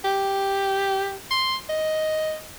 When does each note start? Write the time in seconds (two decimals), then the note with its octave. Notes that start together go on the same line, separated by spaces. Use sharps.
0.04 G4
1.31 C6
1.69 D#5